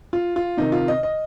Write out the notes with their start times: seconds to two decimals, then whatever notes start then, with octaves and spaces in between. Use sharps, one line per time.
0.13 F4
0.36 F4
0.57 C3 D#3 D#4
0.72 F4
0.88 D#5
1.03 D#5